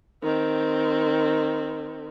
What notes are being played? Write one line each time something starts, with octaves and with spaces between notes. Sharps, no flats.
D#3 C4